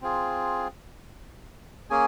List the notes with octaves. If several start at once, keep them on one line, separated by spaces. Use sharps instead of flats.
C4 F4 G#4
A#3 C#4 G#4 G#5